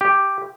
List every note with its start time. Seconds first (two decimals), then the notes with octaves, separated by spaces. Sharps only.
0.01 G4